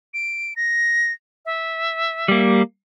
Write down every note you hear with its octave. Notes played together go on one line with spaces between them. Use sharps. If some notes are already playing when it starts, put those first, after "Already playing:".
D7
A#6
E5
G3 A#3